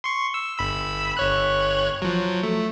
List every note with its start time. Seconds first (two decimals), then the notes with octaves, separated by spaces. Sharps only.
0.04 C6 C#6
0.34 E6
0.58 G1 B5 E6
1.17 G1 C#5 F#6
2.02 F3 F#3
2.43 A3